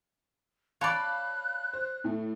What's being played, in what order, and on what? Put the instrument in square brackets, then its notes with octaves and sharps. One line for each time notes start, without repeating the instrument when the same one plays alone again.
[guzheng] C#5 D5 [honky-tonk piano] F5 A5 B5 [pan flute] F#6
[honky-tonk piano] C5
A2 A3